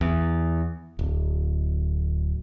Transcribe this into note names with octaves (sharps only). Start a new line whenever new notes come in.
E2
D1